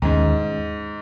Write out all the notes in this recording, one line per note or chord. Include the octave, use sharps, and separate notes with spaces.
D#2 G#2 D#3 A#3 C#4